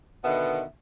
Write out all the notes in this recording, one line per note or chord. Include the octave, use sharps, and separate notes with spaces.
B2 D3 D#3 B3 E5